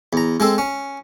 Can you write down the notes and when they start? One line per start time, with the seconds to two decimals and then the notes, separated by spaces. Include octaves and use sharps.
0.13 E2 A#5
0.40 G#3 C4 A4
0.58 C#4